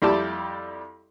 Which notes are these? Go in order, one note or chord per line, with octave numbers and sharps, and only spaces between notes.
F2 G3 E4 G4 D5 A5